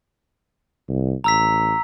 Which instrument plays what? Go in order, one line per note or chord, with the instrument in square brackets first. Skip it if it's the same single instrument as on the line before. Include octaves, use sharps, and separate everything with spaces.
[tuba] C2
[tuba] A1 [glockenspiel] A#5 E6 B6